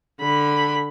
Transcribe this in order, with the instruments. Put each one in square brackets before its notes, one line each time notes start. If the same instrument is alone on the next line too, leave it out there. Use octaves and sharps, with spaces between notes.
[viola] D3 B5